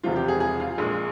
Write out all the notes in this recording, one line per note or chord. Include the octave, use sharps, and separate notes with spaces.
E1 E2 C3 F3 F4
G4
G#4
G#4
F4
A#1 A#2 G#3